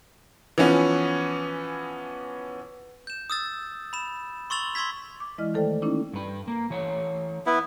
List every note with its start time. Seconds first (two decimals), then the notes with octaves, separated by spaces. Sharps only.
0.58 E3 F3 B3 C#4
3.07 G6 E7
3.30 D#6 E6 A6
3.93 B5 E7
4.50 C6 C#6 E6 A6 F7 F#7
4.75 C6 C#6 E6 G#6 B6
5.20 D6
5.38 E3 G#3 E4 D5 D#5 F6
5.54 D#3 A3 A4 C5 D5 G5
5.82 A#3 C#4 D#4 E4 D6
6.13 G2 B4
6.48 A#3
6.70 E3 A3 C#5
7.46 B3 E4